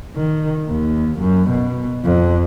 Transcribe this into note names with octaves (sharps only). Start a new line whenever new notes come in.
D#3
D#2
F#2
B2
F2